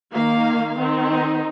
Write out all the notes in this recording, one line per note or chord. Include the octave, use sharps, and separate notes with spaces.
D#3 A#3 F5
D#3 C4
D#4